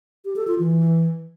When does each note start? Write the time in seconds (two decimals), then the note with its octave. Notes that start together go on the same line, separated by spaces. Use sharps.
0.25 G4
0.36 A4
0.47 F4
0.59 E3